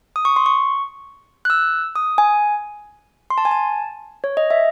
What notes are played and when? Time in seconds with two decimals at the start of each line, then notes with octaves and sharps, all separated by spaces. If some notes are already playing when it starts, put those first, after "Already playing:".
0.16 D#6
0.25 C#6
0.36 C6
0.46 C#6
1.45 F#6
1.50 E6
1.96 D#6
2.18 G#5
3.30 C6
3.38 A5
3.45 G#5
3.51 A5
4.24 C#5
4.37 D#5
4.50 E5